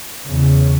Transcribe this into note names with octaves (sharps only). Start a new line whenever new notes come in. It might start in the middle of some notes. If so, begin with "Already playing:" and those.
E2 C#3